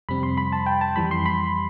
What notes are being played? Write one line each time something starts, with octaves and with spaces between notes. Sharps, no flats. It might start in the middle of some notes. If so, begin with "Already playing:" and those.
F2 C3 G3 C4 B5
C6
B5
A5
G5
A5
F2 E3 G3 B5
C6
B5